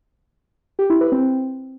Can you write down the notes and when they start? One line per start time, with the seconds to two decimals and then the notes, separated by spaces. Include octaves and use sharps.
0.79 G4
0.90 E4
1.01 B4
1.12 C4